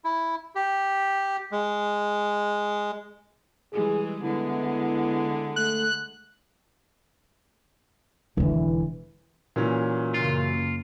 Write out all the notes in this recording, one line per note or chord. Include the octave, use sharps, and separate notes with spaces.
E4
G4
G#3
E3 G3 G#3 G#4
D3 G#3 B3 E4
A3 F#6
E1 D3 E3
A#2 E3 F#3 C#4
F#2 C#3 A#3 F4